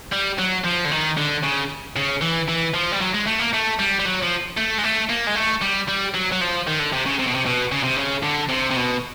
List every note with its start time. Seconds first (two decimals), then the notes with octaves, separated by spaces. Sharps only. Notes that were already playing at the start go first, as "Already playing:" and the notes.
0.12 G3
0.39 F#3
0.64 F3
0.85 D3
0.92 D#3
1.17 D3
1.43 C#3
1.96 C#3
2.21 E3
2.48 E3
2.74 F3
2.92 G3
3.01 F#3
3.14 G#3
3.27 A3
3.39 A#3
3.53 A3
3.79 G3
4.00 G3
4.06 F#3
4.23 F3
4.57 A3
4.78 G#3
4.84 A3
5.10 A#3
5.27 G#3
5.35 A3
5.62 G3
5.89 G3
6.14 F#3
6.32 F#3
6.41 F3
6.67 D#3
6.79 D3
6.93 C3
7.06 C#3
7.19 C3
7.27 B2
7.34 C3
7.46 B2
7.72 C#3
7.84 C3
7.97 C#3
8.23 D3
8.49 C3
8.71 C3
8.76 B2